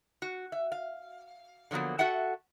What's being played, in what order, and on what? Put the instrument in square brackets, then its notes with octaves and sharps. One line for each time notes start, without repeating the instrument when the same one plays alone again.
[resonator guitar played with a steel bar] F#4
E5
F5
D3 F3 F#3 A#3 B3
F#4 A4 E5 F#5 G5